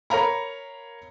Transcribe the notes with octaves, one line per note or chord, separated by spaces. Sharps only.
A#4 C#5 F5 A#5 B5